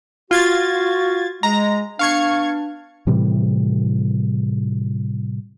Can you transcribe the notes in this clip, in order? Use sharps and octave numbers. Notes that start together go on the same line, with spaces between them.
F4 F#4 G#6 A6
G#3 A#5
B3 D4 F5 C#6 G#6
A2 C3 E3 G3